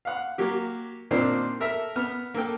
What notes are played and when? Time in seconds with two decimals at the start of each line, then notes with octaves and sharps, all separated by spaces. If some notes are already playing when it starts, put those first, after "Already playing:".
0.05 F5 F#5
0.38 F#3 A#3 G4
1.11 A#2 D#3 A#3 C4 D4 C5
1.60 A4 A#4 E5
1.96 B3 F6
2.34 A#3 A4 G5